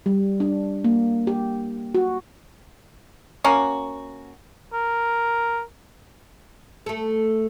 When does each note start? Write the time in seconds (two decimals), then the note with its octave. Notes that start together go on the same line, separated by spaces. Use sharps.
0.06 G3
0.40 D4
0.84 A#3
1.27 G4
1.95 F#4
3.44 A#3 C#4 F#4
4.73 A#4
6.86 A3 A4